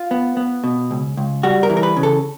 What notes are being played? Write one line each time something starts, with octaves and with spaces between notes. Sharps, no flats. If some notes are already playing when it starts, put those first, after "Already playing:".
Already playing: F4
B3
B3
B2
C#2
C#2
G3 F#4
A#4
E3
A#4
B4
C#3
A4